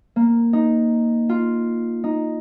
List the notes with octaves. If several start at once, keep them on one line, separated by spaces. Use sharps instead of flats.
A#3
D#4
F4
D#4